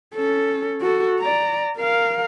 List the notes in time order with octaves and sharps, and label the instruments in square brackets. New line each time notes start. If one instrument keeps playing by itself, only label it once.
[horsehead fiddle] C#4 A4
F#4 A4
D5 A#5
A#4 F5